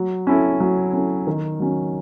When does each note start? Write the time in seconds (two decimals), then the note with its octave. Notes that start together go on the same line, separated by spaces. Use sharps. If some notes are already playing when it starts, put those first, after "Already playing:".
Already playing: F#3
0.27 C#4 E4 A4
0.60 F#3
0.93 C#4 E4 A4
1.27 D#3
1.60 F#3 C#4